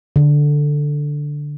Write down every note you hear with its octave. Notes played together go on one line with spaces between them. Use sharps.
D3